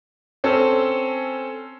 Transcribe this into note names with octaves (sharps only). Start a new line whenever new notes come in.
C4 C#4 A4 G#5